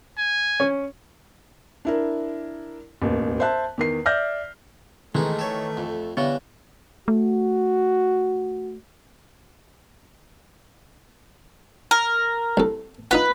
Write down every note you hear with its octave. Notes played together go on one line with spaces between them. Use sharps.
G#5
C#4
D4 E4 A#4
E1 A1 D#2
C5 E5 A5 F#6
E2 D#3 C7
D5 E5 F6 G6 A#6
D#3 E3 G#3 A3 D#4
A4 C#5
F2
D3 E3 G3 B3 C#5 F5
A3 F#4
A#4
C2 A4
D#4 F4 B4 F#5